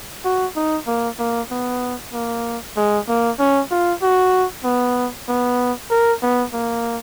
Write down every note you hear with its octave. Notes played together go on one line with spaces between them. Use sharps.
F#4
D#4
A#3
A#3
B3
A#3
G#3
A#3
C#4
F4
F#4
B3
B3
A#4
B3
A#3